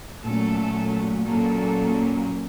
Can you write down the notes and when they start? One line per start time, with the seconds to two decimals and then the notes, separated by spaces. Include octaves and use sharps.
0.25 A#2 F#3 A3 C#4 A4
1.27 A#2 F#3 A#3 C#4 A4